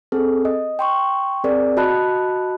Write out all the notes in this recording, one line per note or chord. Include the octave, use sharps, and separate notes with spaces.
C4 G#4 A4
D#5
G5 C6 C#6
C4 G#4 A#4 D5
F#4 D#5 A5 B5 F#6